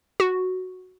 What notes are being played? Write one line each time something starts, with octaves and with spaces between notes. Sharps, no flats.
F#4